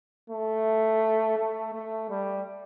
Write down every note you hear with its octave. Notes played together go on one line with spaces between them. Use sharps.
A3
A3
A3
G3